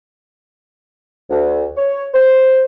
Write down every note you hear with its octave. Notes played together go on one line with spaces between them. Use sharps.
D2
C#5
C5